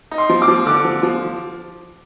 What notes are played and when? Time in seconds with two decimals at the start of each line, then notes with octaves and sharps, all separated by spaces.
0.11 D#4
0.18 C6
0.29 F3
0.42 D6
0.48 F3
0.66 D3 D6
0.85 F3
1.03 F3